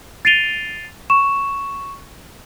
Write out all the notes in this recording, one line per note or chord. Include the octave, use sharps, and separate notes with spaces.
A6 C7 D7 D#7 F7 G7
C#6 E7